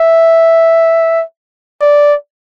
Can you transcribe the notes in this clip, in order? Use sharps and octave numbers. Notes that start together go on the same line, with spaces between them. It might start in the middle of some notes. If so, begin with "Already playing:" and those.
Already playing: E5
D5